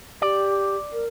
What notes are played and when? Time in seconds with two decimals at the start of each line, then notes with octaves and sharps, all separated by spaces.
0.22 G4 D5
0.92 A#4